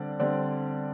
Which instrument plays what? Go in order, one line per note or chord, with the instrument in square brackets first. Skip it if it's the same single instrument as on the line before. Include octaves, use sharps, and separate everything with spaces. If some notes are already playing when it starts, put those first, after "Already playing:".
Already playing: [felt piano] D3 G3 C4 D5
D3 G3 C4 D5